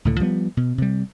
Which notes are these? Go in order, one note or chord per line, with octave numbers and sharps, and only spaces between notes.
C#2 A2 D3
F3 G3 A#3 B3
B2
C3 G3